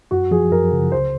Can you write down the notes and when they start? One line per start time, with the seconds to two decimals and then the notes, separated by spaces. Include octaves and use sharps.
0.11 F#2 F#4
0.31 F3 G#4
0.52 F#2 A#4
0.72 C#3
0.92 C#2 C5